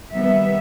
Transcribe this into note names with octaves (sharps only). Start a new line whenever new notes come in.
D#3 G3 B3 E5